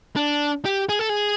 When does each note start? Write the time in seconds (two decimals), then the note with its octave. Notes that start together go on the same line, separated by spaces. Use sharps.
0.16 D4
0.65 G4
0.89 G#4
0.99 A4
1.09 G#4